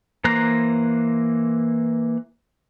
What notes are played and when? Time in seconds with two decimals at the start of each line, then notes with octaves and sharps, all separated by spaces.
0.24 E3 A#3 C5 A#5 F#6